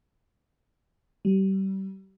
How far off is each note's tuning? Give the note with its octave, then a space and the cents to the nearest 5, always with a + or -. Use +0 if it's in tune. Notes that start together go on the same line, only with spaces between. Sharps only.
G3 -30